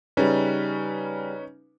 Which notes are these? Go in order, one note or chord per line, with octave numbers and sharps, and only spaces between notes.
C#3 G3 C#4 D#4 B4